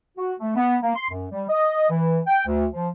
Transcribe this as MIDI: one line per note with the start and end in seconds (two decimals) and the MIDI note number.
0.17 0.33 66
0.40 0.53 57
0.56 0.76 59
0.83 0.92 58
0.95 1.07 84
1.10 1.26 42
1.32 1.44 55
1.49 1.88 75
1.90 2.20 52
2.27 2.44 79
2.47 2.66 38
2.74 2.88 53